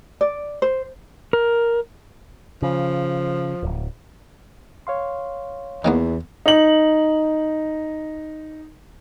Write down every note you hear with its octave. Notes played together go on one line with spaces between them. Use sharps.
D5
C5
A#4
C#3 F3
D1
C#5 F5 C6
E2 D#3 A#3 B3
D#4 F#7